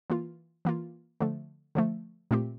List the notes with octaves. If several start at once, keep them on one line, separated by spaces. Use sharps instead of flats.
E3 A#3 F4
E3 A#3 F4
D3 F3 A3
D3 F3 A3
A#2 A3 C4 G4